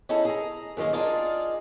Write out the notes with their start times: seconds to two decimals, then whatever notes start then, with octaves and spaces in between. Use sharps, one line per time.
0.09 C#4 D#4 E4 G#4 A4
0.25 G#4 A#5
0.77 F#2 D#3 G3 G#3 A#3
0.93 D4 D#4 F4 G#4 A#4 D5